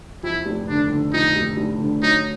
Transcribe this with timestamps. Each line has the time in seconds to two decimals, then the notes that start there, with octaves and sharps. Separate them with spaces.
0.23 F2 E4
0.46 F1
0.68 D3 D4
0.90 D3
1.13 F2 D#4
1.36 F1
1.57 F1
1.80 D3
2.02 F#3 D#4